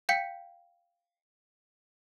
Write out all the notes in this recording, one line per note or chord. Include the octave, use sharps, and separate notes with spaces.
F5 G5 G6 B6 C#7